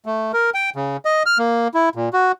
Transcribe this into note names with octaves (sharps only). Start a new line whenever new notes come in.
A3
A#4
G5
C#3
D#5
F6
A#3
E4
A#2
F#4